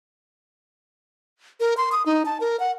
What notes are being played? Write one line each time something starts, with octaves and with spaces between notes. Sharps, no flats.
A#4
C6
D#6
D#4
A5
A#4
F#5